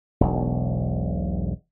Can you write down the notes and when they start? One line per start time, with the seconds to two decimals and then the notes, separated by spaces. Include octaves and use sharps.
0.21 E1 B1